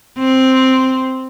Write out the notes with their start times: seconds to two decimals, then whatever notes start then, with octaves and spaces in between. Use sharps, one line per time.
0.18 C4